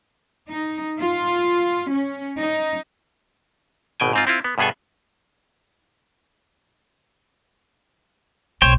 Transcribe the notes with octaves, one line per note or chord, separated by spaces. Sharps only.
D#4
F4
C#4
D#4
G#1 B2 G5 G#5
G#2 C4 F4
C4 E4 F4
B3
G2 B2 B3 G#4 A4 G#5
B1 C5 C#5 G5